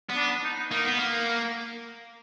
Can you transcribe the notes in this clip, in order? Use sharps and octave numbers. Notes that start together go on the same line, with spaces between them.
B3
D4
D#4
A#3 D#4
B3
A#3